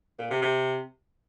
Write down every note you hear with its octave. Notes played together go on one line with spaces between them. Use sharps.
A#2
C3
C3